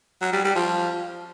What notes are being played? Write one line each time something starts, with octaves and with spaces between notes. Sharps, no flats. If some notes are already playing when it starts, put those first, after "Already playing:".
F#3
G3
G3
F3